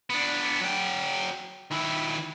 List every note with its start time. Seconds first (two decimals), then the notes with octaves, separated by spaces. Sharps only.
0.10 B3 D4
0.61 F#3 G5
1.71 D#3 E4